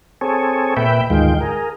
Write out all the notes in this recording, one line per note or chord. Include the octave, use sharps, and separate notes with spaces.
C4 G#4 A4 C#5
A#2 B4 E5 G5
D2 G#2 D#3 G#3 F4 G5
G#4 A#4